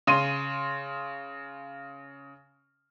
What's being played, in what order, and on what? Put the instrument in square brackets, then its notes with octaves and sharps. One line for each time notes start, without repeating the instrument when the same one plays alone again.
[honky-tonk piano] C#3 C6 D#7